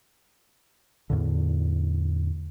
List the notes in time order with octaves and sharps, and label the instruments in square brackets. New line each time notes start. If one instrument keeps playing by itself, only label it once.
[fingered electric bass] E2 A2 D3